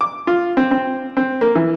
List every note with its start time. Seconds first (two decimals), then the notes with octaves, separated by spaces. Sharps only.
0.01 D6
0.27 F4
0.57 C4
0.71 C4
1.17 C4
1.41 A#3
1.55 E3